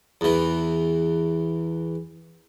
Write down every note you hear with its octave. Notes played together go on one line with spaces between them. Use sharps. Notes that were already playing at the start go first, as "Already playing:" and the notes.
E2 E3